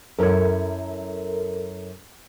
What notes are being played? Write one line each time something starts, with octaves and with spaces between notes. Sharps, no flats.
F#2 E4 A4 A#4 C#5